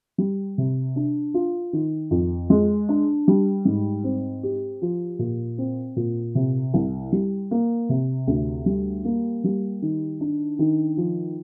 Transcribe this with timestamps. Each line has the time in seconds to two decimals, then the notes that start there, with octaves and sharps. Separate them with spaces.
0.18 G3
0.58 C3
0.96 D4
1.34 F4
1.73 D#3
2.11 F2
2.50 G#3
2.89 D4
3.28 G3
3.65 G#2
4.04 C4
4.43 G4
4.82 F3
5.19 A#2
5.58 C4
5.96 A#2
6.35 C3
6.74 C2
7.12 G3
7.51 A#3
7.89 C3
8.27 D2
8.66 G3
9.05 A#3
9.44 G3
9.82 D#3
10.21 D4
10.59 D#3
10.97 F3